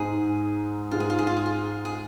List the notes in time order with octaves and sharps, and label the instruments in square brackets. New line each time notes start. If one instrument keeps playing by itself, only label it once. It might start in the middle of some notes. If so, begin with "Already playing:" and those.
Already playing: [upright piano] G#2 G#3 D#4 [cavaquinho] G#4
[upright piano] G#2 G#3 D#4 [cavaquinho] F4
[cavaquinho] G#4
F4
G#4
F4
G#4
F4
G#4